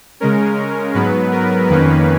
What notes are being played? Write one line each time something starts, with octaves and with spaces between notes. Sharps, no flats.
C#3 G#3 C#4 A#4
G#2 F#3 B3 B4
A#4
F2 D#3 A#3 C#4 B4